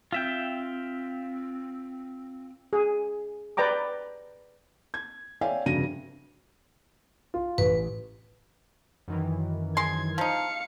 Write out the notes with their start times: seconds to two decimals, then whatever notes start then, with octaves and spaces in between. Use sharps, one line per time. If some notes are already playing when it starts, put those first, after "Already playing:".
0.12 C4 F4 E5 G5
2.73 G#4
3.57 B4 D5 G5 A#5 D6
4.94 G#6
5.41 C#5 D5 E5 F5 G5 G#5
5.66 F1 G2 C#3 F#4 A#6 D#7
7.34 F4
7.58 A1 B4
9.08 F#2 D#3 E3
9.77 G#3 C6 G#6
10.18 F3 D#4 F5 C#7